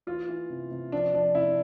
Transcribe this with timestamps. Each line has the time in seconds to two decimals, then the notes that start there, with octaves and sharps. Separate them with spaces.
0.07 E3 F4
0.29 E3
0.50 C3
0.71 C3
0.92 F3 D4
1.13 F3 D4
1.35 C3 E4